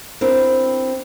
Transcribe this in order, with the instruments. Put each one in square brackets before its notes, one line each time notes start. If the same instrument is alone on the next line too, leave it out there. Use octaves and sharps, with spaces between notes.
[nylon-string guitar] C4 D4 E4 A#4